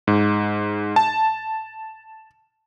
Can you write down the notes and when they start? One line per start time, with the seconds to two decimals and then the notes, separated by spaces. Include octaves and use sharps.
0.07 G#2
0.96 A5